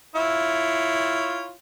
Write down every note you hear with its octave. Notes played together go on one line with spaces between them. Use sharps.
E4 F4 C#5